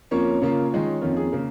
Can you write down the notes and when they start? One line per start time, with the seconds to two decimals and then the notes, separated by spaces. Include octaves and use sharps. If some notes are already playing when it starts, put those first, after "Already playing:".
0.11 F2 F3 A#3 C#4 C#5
0.42 C#3 A#3 F4
0.71 D#3 G#3 F4
1.01 F2 D#3 A#3 C#4 F4 A#4
1.17 G#4
1.32 C#3 A#3 A#4